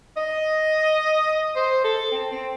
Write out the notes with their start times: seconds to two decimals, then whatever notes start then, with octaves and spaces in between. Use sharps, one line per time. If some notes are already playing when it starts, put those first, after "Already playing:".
0.17 D#5
1.56 C5
1.84 A4
2.12 C4
2.31 C4